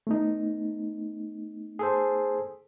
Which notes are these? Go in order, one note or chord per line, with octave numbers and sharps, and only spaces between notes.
A3 B3 D#4
G#4 A4 C5